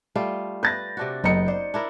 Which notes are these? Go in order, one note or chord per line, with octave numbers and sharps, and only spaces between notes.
G3 A3 F4
B4 G6 A6 A#6
C3 D4 F#4
F#1 B3 D#4 C#7
C5 D5
D4 E4 A#4